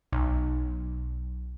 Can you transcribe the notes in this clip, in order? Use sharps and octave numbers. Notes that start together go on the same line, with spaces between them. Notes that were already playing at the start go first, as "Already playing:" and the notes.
B1